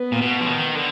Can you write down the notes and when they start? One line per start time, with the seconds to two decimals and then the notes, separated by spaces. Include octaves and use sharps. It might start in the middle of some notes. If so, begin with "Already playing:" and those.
Already playing: B3
0.12 A#2
0.21 B2
0.40 F3
0.47 D#3
0.75 D3